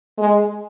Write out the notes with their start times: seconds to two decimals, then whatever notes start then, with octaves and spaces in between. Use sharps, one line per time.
0.18 G#3